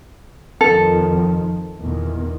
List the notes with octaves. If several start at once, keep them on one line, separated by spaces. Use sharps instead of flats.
F2 D#3 F3 A4
E2 A#2 D#3